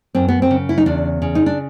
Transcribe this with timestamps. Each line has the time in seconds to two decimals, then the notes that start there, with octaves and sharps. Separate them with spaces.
0.15 F#2 C4
0.28 B3
0.42 C4
0.51 C#3
0.69 E4
0.78 D#4
0.86 E2 D4
1.22 C#3
1.35 D#4
1.46 D4